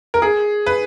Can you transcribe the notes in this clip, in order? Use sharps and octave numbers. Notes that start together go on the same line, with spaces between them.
A#4
G#4
B4